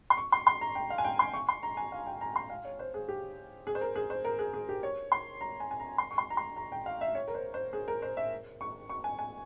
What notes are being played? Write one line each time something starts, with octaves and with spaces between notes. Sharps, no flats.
C6
C#6
C6
C6
A#5
G5
F5
G#5
G5
C6
C#6
C6
A#5
G#5
F5
G5
A#5
C6
F5
C#5
C5
G#4
G4
G#4
C5
A#4
G#4
C5
A#4
G#4
G#4
G4
C#5
C6
A#5
G#5
G#5
A#5
C6
C#6
C6
A#5
C6
A#5
G5
F5
E5
C#5
A#4
C5
C5
G#4
A#4
C5
E5
C#6
C#6
G#5
G#5